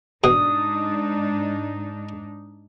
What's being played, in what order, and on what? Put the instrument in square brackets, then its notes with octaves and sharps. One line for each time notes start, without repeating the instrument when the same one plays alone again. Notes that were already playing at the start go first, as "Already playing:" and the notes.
[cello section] G#2 D4 D#4 [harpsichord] B2 [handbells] D#6